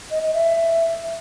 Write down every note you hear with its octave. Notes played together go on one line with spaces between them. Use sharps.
D#5
D#5
E5